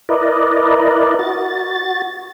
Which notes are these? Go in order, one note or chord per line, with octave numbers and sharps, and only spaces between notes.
E4 A#4 B4 D5 D#5
F#4 A6